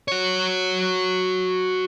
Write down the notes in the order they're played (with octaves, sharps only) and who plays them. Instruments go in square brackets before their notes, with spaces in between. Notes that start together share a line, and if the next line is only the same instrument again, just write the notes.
[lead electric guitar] F#4 C#5